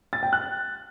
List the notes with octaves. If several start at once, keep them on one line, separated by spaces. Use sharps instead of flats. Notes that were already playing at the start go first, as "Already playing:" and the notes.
A6
G5
F#6